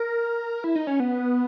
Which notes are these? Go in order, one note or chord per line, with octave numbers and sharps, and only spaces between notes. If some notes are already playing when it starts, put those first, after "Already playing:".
Already playing: A#4
E4
D#4
C#4
B3